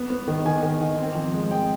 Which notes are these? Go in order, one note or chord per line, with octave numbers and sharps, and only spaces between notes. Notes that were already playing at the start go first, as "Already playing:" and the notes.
Already playing: B3
B3
D#3
D#3 G#5
D#3
D#3
C4
F3
G#3
G#3 G5